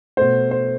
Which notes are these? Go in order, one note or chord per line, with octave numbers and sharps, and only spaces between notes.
B2 A3 C5
C5